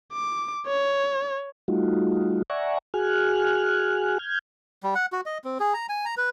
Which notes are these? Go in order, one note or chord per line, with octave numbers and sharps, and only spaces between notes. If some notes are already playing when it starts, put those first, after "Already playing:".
D6
C#5
G3 A3 D#4 F4 F#4
D5 E5 F#5 G#5 A#5 C#6
F#4 G#4 G#5 F6 F#6
F6 G6 G#6
G3
F#5
F#4
D#5
C4
G#4
A#5
G#5
A#5
B4